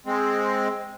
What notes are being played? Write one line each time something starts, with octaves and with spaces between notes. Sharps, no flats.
G#3 C4